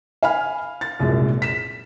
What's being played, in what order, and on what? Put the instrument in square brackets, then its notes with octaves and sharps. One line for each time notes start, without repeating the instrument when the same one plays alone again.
[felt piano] F5 G#5 B5 F6
A6
C2 F#2 A#2 G#3
B6 E7